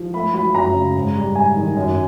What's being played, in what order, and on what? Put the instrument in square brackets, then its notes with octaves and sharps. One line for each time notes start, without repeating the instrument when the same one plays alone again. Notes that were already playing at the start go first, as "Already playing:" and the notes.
Already playing: [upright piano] F3
A3 B5
F#3 B5
F#2 A#5
C#3
G#2
G3
G#2 G#5
D#3
F#2